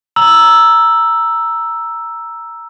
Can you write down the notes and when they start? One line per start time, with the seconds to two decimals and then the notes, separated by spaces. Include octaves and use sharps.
0.16 A#5 E6 F#7